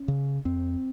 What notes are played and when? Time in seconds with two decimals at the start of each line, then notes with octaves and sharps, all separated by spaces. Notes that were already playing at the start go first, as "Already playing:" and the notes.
Already playing: C#4
0.08 C#3
0.45 F2 C4